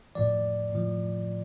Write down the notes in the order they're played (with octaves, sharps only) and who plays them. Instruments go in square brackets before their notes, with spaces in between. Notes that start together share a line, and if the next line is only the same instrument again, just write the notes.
[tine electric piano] A2 F3 D5
A2 F3